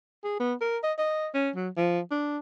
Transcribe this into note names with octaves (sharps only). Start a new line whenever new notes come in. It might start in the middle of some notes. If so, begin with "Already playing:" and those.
G#4
B3
A#4
D#5
D#5
C#4
F#3
F3
D4